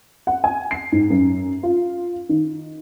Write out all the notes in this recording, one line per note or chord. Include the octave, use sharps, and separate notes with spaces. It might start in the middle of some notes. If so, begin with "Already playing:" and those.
F#5
G#5
C7
G#2
F#2
F4
D#3